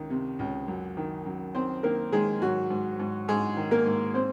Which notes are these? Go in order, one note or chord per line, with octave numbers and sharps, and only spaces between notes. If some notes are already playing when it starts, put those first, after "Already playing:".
Already playing: C#2 D#3
C3
C#2
F#2
D#3
F#2
D#3 C4 C5
D#3 A#3 A#4
D#3 G#3 G#4
G#2 F#3 F#4
G#2
G#2
G#2 G#3 G#4
D#3
A#3 A#4
G#2
C4 C5